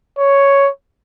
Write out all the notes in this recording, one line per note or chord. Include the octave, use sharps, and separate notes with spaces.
C#5